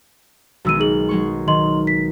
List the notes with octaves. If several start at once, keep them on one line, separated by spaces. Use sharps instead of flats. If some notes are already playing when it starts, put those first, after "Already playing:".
B1 D#3 G#3 F#4 E6 D#7
G#4 F#7
F#3 G#3 C#6
D#3 D#5 C6 F#7
B6